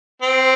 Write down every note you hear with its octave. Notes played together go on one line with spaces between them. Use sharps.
C4